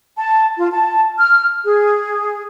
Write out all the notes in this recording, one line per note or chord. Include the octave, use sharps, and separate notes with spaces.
A5
F4
A5
F6
G#4